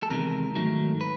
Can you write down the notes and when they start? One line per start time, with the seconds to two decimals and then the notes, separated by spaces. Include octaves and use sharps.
0.03 A4
0.10 E2 C3 D#3 G#3 A#4
0.55 G#2 D#3 F#3 A3
1.01 B4